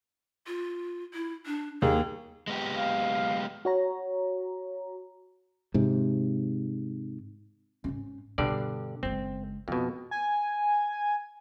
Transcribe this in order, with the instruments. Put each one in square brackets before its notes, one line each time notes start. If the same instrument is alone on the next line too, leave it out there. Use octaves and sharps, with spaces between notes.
[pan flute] F4
E4
D4
[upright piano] D#2 G#4 [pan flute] A#3
[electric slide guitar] G#3 B3 G4
[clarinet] F5
[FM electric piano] F#4 C#5 A#5
[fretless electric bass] G#2 C3
[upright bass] G#2 C#4
[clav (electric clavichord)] G2 D3 D5 [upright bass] B2
[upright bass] F#1 G#3 [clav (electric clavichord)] C4
[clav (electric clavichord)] F2 B2 [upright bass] D#4
[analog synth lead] G#5